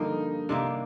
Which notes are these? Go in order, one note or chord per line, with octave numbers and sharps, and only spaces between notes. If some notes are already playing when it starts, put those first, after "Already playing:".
Already playing: G2 D3 F3 A#3 D#4
C3 D#3 A#3 D4